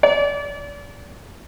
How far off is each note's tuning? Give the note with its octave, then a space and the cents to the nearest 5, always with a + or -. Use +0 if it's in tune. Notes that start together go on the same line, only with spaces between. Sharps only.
D5 -30